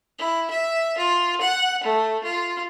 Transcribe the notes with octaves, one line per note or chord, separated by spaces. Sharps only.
E4
E5
F4
F#5
A3
F4